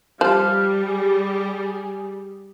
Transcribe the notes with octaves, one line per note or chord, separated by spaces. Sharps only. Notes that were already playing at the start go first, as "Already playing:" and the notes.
F3 G3 F5
G#4